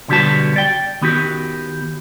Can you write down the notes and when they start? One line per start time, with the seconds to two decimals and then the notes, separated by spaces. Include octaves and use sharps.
0.08 B1 D3 G3 B3 F#4 A5
0.56 D5 G5
1.01 D#3 B3 F#4 G4